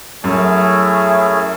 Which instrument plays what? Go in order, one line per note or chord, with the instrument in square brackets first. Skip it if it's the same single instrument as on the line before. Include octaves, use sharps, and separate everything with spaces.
[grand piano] F#2 [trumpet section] A3 C#4 E4 G#4